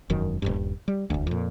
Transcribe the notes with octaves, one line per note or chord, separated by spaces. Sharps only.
E1 F#2 D#3
D#1 G#1 G2
G3
E1 D2
F2 A#2